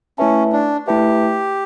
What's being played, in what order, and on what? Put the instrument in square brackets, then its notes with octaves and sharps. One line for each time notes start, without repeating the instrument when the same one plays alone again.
[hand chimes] A3 E4 B4 E5 A5 [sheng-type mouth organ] C#4
[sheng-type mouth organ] D4
[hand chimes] A3 E4 B4 E5 A5 [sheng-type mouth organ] G4